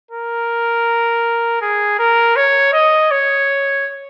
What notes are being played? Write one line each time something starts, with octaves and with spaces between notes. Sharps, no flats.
A#4
G#4
A#4
C#5
D#5
C#5